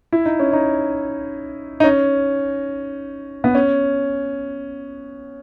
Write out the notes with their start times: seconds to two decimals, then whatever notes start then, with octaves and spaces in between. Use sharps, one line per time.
0.12 E4
0.26 D#4
0.39 C#4
0.53 D#4
1.80 D#4
1.84 C#4
3.44 B3
3.55 C#4